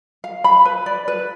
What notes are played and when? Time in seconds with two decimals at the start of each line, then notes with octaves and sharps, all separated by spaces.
0.24 F5
0.44 B5
0.65 B4
0.86 D5
1.08 B4